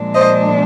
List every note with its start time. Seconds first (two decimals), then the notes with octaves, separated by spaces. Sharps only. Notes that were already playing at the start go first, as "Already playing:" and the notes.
Already playing: A#2 F3 G#3 D4
0.14 C5 D#5